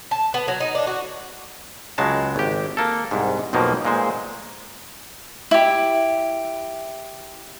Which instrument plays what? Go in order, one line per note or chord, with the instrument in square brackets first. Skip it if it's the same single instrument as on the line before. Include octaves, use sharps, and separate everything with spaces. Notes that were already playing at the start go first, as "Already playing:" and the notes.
[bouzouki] A5
B3
F#3
D#4
D4
F#4
[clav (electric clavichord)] C#2 F#3 G#3 A5
G#1 G4
A#3 A4
C2 G#2
B1 F2 B2 F3 A#3
A#2 G#3 C5
[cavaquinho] E4 G4